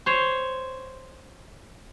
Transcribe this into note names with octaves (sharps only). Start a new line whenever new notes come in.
C5 C#5